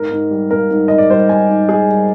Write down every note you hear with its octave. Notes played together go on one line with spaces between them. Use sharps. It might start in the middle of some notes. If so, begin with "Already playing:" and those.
Already playing: G#2 A#4
G#2
G3
A#3 A#4
G#2
G#2 D#5
D5
G3 C5
A#3 G#5
G#2
G#2 G#4
G3